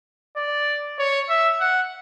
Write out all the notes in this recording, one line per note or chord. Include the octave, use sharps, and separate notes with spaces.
D5
C#5
E5
F#5